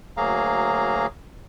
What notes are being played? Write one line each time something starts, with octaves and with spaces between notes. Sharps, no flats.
D2 F#3 A#3 G#4 F5 A#5